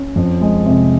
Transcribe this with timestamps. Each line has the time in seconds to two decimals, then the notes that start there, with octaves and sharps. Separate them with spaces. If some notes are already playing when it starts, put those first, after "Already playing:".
Already playing: C#4
0.16 F2
0.41 G#3
0.66 C3